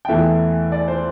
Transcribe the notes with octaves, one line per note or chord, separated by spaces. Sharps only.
G5
E2 E3 A3 E5
D5
C5